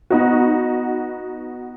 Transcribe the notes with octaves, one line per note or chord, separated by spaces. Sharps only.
B3 D#4 F#4